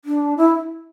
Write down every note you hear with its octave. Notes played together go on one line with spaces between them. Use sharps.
D4
E4